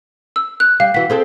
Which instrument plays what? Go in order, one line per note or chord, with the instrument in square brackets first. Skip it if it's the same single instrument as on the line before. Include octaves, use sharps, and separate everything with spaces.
[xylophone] E6
F#6
[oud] G3 [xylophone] F5
[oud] E3 F#4 [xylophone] B6
[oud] C4 G#4 A4